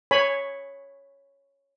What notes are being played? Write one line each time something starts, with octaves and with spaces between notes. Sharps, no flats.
C#5 G#5 B5